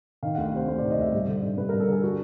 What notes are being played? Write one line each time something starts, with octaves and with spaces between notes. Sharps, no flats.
D#3 F5
D2 F#5
F5
C3 C5
D2 C5
D#3 D5
D#5
D2 E5
G2
D3
D3
G2 B4
G2 A#4
A4
D3 G#4
F#4